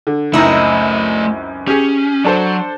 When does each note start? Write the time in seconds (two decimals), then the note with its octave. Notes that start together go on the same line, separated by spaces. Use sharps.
0.07 D3
0.33 C#2 F#2 A3 C4 D#4 E4 D#5
1.67 C#4 G4 G#4
2.25 F#3 D4 A4 C5